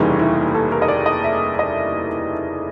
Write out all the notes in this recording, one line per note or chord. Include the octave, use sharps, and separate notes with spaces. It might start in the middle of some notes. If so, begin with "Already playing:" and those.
Already playing: F1 D#2 C#3 E3 G3 D#4
E4
A4
A#4
D#5
D5
D#5
E5
D#5